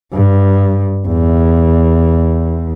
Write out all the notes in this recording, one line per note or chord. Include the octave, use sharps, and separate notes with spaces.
G2
E2